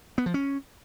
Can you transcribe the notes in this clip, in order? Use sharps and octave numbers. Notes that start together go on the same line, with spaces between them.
B3
F3
C#4